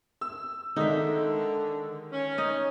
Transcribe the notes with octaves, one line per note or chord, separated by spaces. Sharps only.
E6
D3 D#3 G#3 D#4 E5
C#4
D#4 D#5